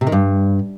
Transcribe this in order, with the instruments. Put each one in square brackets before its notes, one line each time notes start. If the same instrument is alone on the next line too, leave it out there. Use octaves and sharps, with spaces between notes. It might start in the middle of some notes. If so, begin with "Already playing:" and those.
[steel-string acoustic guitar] C3
D#3
G2